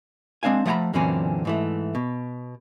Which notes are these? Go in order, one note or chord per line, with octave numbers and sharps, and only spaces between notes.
G#3 C4 D4 F5 G#5
F3 A3 F#5 G5 A#5 B5
F#2 A#2 D3 E3 C4 C#4
G#2 E3 A3
B2